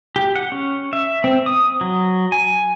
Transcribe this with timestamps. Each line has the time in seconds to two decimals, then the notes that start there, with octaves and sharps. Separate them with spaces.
0.16 G4
0.36 F#5
0.52 C#4
0.93 E5
1.24 C4
1.46 D#6
1.81 F#3
2.32 G#5